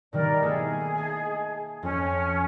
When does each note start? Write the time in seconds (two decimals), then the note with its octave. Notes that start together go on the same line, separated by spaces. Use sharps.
0.13 B2 D#3 G3 A#4 D5
0.42 A3 A#3 E4 G#4
0.96 D#5 G#5 A5
1.83 F2 C#4